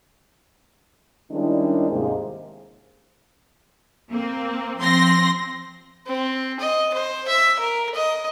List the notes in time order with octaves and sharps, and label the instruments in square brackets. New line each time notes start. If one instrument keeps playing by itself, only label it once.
[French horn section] D#3 G3 G#3 C#4 D4 E4
D#2 G#2 C3 G#3 A#3 C5
[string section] A#3 C4
F3 C4 C6 A#6
[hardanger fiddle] C4
D#5
C5
E5
A#4
D#5